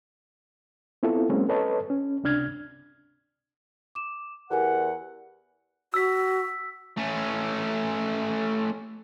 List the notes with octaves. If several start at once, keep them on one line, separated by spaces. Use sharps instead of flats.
B3 C4 E4 F4 A4
F#3 G#3 A#3 C4 C#4
A4 B4 C#5 D#5 A5
C#4
C#2 C3 D4 F6 G#6
D6 E7
E2 G4 A#4 F#5 G#5
F#4 E6 B6
A3 C#4